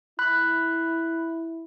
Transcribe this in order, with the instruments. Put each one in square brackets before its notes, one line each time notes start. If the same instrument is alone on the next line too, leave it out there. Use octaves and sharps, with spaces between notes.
[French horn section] E4 [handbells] B5 F#6